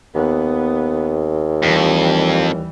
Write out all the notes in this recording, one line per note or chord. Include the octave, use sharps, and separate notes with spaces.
D#2 B3
F2 E3 G3